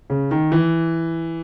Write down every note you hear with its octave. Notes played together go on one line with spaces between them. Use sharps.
C#3
D#3
E3